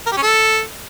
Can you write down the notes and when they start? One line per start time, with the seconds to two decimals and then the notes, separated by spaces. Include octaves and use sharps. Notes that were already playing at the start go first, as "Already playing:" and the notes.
0.06 A#4
0.12 G4
0.17 C#4
0.23 A4